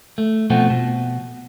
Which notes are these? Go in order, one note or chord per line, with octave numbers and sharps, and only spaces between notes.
A3
B2 F3 A3 C4 F#4
B2